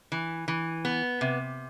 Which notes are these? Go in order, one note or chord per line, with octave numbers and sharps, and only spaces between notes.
E3
E3
B3
C3